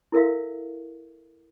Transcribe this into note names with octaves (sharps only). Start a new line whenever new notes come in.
E4 A4 A#4 E5 F5